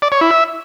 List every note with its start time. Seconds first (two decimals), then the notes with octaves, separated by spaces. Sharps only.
0.02 D5
0.12 C#5
0.21 E4
0.31 E5